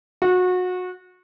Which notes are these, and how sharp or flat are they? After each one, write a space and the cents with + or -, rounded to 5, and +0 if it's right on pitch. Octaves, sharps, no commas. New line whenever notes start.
F#4 -25